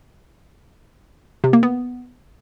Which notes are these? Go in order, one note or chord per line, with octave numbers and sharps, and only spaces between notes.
C3
A#3
B3